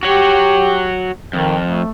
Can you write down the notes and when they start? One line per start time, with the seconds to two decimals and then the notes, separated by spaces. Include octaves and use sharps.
0.03 F#4 G4 C#5
1.33 F2 D#3
1.66 A3